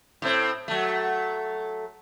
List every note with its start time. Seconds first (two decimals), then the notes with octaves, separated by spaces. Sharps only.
0.22 A2 C4
0.68 F#3 A3